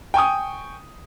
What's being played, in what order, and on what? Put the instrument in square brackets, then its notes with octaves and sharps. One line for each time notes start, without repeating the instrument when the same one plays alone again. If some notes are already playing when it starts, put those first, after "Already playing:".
[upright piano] G5 G#5 C#6 D#6